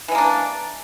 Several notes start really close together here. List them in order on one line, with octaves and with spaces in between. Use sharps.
E3 G#3 A#3 D4